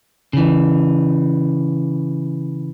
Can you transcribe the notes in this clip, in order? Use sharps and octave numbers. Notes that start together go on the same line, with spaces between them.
C#3 E3